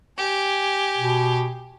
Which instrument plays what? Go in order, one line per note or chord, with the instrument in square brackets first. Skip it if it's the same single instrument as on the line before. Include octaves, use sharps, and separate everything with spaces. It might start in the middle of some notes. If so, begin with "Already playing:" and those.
[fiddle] G4 G#5
[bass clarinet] B2